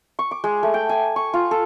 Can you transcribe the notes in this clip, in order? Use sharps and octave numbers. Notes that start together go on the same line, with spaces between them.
C#6
D6
G#3
A3
G5
G#5
C#6
F4
A4